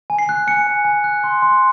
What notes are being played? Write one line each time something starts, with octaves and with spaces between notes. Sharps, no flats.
G#5
C7
F#6
G#5 C#7
G#5
G#5
F#6
C6
C6